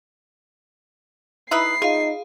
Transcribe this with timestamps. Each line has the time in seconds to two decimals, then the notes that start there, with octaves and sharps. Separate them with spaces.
1.51 D#4 E4 B4 E5 B5 D#6 C7
1.82 D#4 F4 G#4 F5